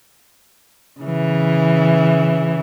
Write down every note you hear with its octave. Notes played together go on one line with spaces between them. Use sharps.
C#3 E3